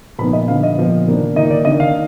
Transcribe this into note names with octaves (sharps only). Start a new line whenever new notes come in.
A#2 F3 B3 D#4 B5
D#5
D3 F3 B3 F5
D#5
A#2 F3 B3
D#3 A#3 D4
D#3 A#3 D#4 D#5
D5
D#3 A#3 D4 D#5
F5